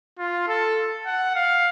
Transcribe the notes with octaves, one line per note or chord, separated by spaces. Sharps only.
F4
A4
F#5
F5